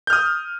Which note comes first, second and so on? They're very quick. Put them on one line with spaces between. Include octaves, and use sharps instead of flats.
G6 F6 D#6